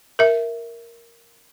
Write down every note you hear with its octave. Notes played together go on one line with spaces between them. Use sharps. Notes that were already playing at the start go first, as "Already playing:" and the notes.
A#4 E5